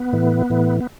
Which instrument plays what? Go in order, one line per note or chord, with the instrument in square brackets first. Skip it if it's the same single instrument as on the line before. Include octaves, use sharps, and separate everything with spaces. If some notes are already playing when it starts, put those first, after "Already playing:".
Already playing: [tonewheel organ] B3
A2 E3
A2 E3
B3